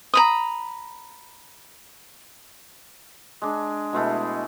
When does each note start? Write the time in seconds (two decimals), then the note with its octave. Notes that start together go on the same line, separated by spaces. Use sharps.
0.14 A#5 B5 D#6
3.42 G#3 D4
3.93 B2 G#3 A3 E4